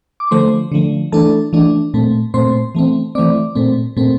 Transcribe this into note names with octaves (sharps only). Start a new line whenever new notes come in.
D6
D3 F3 A3 C5 C6
D3 F3 A3
E3 A3 D4 A4 A5
E3 A3 D4
A#2 A3 C4
A#2 A3 C4 C5 C6
E3 A3 C4
E3 A3 C4 D5 D6
A#2 A3 C4
A#2 A3 C4